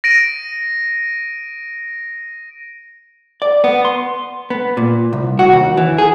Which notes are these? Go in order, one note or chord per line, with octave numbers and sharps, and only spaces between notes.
A#6 D7 D#7
D5
B3
C6
B3
A#2
C2
F#4
D#2
E3
G#4